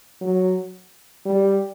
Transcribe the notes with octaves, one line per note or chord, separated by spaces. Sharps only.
F#3
G3